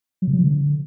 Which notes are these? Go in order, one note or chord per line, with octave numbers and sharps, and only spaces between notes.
F#3
C3
F#3
F3
D3